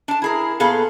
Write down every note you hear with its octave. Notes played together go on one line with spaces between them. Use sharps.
D4 A5
E4 G#4 A#4
A#2 B3 G#4 A4 F5